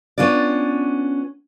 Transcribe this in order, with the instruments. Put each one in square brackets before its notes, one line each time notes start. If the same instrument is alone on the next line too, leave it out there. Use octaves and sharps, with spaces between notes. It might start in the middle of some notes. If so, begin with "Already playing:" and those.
[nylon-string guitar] B3 C#4 D4 F4 D5